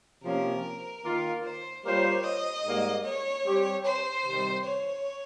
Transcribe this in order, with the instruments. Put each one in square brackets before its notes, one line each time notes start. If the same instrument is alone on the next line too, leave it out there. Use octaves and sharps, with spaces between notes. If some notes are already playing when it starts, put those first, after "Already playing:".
[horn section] C3 F3 A#3 C#4 [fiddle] A#4
[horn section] D#3 A#3 F4
[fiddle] C5
[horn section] G3 A#3 F4 C5 [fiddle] C#5
[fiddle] D#5
[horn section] G#2 G3 A#3
[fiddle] C#5
[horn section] G3 C4 G4
[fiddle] C5
[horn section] C3 D#3 G3
[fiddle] C#5